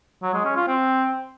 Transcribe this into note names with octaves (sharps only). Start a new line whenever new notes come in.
F#3
G#3
C#4
F4
C4